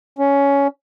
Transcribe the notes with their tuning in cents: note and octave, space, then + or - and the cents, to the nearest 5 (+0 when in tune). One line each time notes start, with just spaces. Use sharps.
C#4 +15